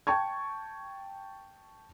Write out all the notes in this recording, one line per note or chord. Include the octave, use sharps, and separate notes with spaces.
G5 A5 C#6 G#6